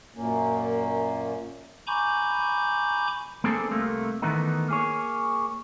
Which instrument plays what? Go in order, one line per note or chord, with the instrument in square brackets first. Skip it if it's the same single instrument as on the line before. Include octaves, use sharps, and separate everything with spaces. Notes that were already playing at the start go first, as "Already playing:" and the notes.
[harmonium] F#2 A#2 A#3 C#4
[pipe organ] G#5 A#5 B5 C#6 D6 G6
[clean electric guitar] A#3 C4 D4 G#4 A4 C5
C2 C3 A3 A#3
D#3 E3 A3 B3 D#4
A#3 G#4 C#5